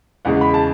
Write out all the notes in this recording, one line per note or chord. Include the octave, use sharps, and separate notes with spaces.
E2 C#3 G#3 F#5
B5
A5